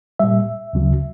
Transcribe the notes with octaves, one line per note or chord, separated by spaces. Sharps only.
A#2 G3 E5
D2 C#3 F#3